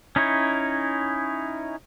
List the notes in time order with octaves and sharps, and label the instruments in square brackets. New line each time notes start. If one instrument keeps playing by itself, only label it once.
[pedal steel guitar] C#4 D#4 E4 C#5